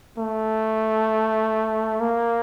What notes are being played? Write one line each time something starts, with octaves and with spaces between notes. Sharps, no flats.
A3
A#3